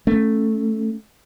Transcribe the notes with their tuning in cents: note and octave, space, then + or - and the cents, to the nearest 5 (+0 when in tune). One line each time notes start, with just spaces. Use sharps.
A3 +0 C#4 +0